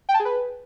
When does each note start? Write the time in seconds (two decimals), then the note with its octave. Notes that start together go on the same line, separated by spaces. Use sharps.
0.09 G5
0.14 A5
0.20 G#4
0.25 B4